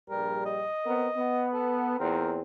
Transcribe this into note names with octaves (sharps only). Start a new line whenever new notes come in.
A#1 G2 G3 A#4
D#5
B3 C4 A#4
B3
A4
E2 A#2 C4 A#4